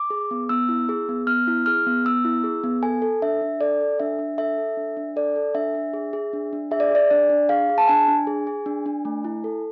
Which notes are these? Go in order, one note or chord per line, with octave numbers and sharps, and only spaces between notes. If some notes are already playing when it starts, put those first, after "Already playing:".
Already playing: D6
G#4
B3
B3 E6
E4
G#4
B3
B3 F6
E4
G#4 F6
B3
B3 E6
E4
G#4
B3
A4 G#5
A4
D4 E5
D4
A4 D5
A4
D4 E5
D4
A4 E5
A4
D4
D4
A4 D5
A4
D4 E5
D4
G#4
G#4
D4
D4
G#4 E5
D5
G#4 D5
D4 D5
D4
G#4 F5
G#4
A5
D4 G#5
D4
G#4
G#4
D4
D4
A3
E4
A4